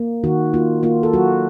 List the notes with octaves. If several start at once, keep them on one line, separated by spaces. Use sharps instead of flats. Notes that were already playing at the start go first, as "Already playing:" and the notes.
Already playing: A#3
D#3 F#4
A#3 F4
A#3 F4
A4
F#3 F#4